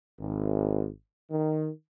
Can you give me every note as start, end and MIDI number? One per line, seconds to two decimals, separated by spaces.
0.20 0.88 32
1.31 1.68 51